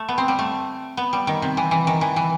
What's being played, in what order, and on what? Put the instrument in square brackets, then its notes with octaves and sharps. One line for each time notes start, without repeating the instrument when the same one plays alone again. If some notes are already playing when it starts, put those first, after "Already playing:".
Already playing: [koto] A3
B3
C4
G3
A3
B3
G3
D#3
C3
E3
E3
D#3
E3
E3